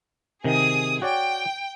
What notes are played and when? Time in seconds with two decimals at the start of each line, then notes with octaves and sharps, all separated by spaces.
0.44 C3 D#3 G#4 D#6
1.02 F#4 C#5 D5 G5